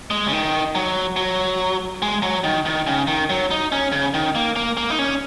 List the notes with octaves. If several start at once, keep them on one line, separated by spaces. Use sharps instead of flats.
G#3
C#3
D#3
F#3
F#3
G#3
F#3
D#3
D#3
C#3
D#3
F#3
D#4
C#4
C#3
D#3
A#3
A#3
A#3
D#4
C#4